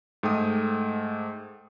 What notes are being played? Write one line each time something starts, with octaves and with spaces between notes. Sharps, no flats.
G#2 A3 G5 D#6